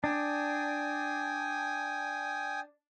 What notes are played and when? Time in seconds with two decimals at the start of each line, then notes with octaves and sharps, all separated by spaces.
0.04 D4 G5 G#5 D#6